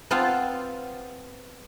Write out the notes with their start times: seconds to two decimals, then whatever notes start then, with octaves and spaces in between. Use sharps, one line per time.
0.11 B3 C4 F4 F5 A5